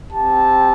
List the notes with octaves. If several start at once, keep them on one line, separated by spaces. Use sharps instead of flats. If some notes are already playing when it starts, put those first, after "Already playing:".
C4 G4 A5